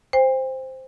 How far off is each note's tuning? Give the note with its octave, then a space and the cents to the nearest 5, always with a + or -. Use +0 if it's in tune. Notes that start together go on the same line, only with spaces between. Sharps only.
C5 +0 G5 +40